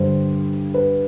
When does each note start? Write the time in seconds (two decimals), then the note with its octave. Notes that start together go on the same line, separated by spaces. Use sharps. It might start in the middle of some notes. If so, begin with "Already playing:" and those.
Already playing: G2 D3 G3 C5
0.74 B4